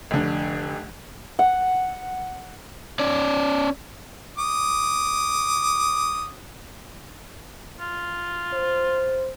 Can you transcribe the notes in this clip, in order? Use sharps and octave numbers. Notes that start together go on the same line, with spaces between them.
F1 D3
F#5
C#4 D5
D6 D#6
F4
C5